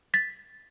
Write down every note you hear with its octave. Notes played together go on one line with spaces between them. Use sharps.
A6 B6